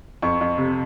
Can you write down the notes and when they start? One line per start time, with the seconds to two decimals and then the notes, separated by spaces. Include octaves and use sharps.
0.22 F2 C#6
0.41 F2
0.58 C3